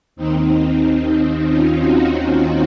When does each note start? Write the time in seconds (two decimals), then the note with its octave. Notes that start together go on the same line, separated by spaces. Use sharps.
0.16 D#2 D#3 C4 D#4
1.48 C#4 F4
1.80 D#4 F#4
2.13 D#4 F#4